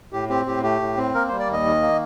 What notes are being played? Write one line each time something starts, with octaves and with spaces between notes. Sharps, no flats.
A2 G4
C4 G4
A2 G4
A3 G4
A2
C4
A#3 A#4
G3 C5
D5
D#2 D#5
D#3
A#3